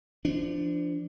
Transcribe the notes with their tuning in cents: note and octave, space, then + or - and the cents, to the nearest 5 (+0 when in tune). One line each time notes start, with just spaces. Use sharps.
F3 -25 D4 +0